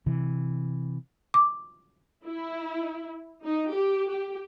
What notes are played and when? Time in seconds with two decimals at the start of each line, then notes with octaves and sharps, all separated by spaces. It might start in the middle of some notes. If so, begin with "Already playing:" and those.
0.06 C3 E3
1.34 D6
2.26 E4
3.44 D#4
3.72 G4
4.10 G4